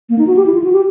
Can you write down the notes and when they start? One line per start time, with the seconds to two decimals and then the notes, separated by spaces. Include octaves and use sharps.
0.10 A#3
0.18 D#4
0.27 F#4
0.36 G4
0.46 E4
0.54 F4
0.64 F#4
0.73 G4